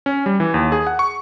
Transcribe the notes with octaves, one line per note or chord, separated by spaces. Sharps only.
C#4
G3
E3
D#2
G#4
F#5
C#6